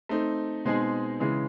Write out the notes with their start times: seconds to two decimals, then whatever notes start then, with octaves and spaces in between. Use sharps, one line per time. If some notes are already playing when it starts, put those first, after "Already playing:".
0.09 A3 C4 D#4
0.65 B2 G#3 C4 D#4 G#4
1.20 C#3 E3 G#3